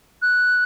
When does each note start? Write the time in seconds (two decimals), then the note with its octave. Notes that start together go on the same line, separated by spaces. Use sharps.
0.22 F#6